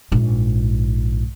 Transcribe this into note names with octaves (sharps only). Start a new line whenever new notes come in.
A#1 G#2